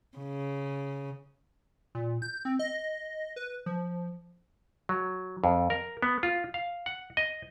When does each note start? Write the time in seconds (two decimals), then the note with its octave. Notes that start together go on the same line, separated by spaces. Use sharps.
0.17 C#3
1.95 A#2
2.22 G6
2.45 C4
2.59 D#5
3.36 B4
3.66 F3
4.89 F#3
5.44 F2
5.70 A#4
6.02 B3
6.23 F4
6.54 F5
6.86 F#5
7.17 D#5